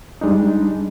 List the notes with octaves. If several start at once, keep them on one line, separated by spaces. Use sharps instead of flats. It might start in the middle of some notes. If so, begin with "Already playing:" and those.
G3 G#3 D4 D#4